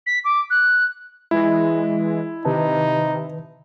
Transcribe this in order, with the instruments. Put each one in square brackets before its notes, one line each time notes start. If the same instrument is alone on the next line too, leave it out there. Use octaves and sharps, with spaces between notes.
[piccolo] B6
D6
F#6
[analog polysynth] E3 G#3 [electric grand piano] E4
[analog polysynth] C3 [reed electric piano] D#3 B4 A5 [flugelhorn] D#4